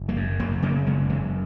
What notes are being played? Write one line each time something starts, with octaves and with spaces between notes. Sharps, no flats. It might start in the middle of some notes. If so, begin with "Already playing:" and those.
Already playing: F#1
F#3 A#3
F#2
F#1 F#3 A#3
C#3 A#3 C#4
F#1 G#3 B3
F#2 E3 G#3